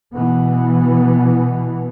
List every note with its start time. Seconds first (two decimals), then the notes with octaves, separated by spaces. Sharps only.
0.13 B2 E3 B3